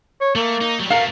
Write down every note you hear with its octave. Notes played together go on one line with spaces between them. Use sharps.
C#5
A3 A#3
D#4
F#3 G3
B2 A3 A#4 F5